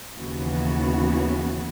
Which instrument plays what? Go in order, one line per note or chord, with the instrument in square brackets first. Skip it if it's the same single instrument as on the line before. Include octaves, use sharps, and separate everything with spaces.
[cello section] D#2 C#3 E3 B3 F#4